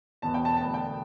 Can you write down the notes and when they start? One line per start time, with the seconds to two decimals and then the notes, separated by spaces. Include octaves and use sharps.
0.22 E1 E2 B2 B3 A5
0.34 G5
0.45 A5
0.57 E1 D2 D3 B3 A5
0.74 G5